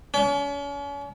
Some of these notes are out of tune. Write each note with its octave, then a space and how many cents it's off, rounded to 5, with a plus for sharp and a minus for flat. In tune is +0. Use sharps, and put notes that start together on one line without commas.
C#4 +40